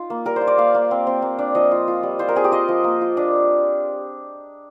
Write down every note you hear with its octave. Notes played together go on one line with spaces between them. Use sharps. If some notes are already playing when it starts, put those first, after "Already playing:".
Already playing: D#4 F4
A#3
G3 A#4
C5
F4
D5
A#3 F5
A#3
C4
C4
A#3
D4
F3 D#5
F4
F4
G3
F4 C5
A#4
C4 G#4
G4
F4 D#5
F3
A#3
F4
D4